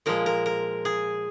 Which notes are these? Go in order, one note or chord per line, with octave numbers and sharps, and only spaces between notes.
A#2 F3 G#3 A#4
A#4
A#4
G#4